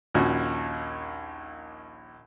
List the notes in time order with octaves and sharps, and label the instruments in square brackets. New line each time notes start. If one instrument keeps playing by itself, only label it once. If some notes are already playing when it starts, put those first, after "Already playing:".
[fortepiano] A#1 D#2 C#4 F#4 D#5